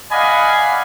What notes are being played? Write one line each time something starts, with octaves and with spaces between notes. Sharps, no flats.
D5 D#5 F5 F#5 G#5 B5